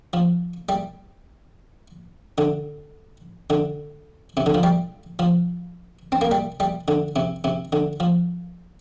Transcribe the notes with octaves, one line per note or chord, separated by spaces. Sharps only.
F3
G3
D3
D3
C3
D3
F3
G3
F3
C4
A#3
G3
G3
D3
C3
C3
D3
F3